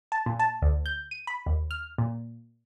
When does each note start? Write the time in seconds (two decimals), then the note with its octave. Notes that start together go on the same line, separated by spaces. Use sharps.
0.12 A5
0.26 A#2
0.39 A5
0.62 D2
0.86 G6
1.11 D#7
1.27 B5
1.46 D#2
1.71 F6
1.98 A#2